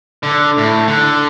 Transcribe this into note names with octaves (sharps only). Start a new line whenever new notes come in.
D3
A2
D3